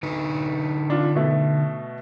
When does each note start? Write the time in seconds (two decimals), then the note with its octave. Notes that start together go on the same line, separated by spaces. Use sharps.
0.03 D3 D#4 B4
0.90 D4 F4
1.15 B2 A3